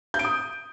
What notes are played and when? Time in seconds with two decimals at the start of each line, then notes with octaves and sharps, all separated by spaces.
0.14 G6
0.19 D7
0.25 D#6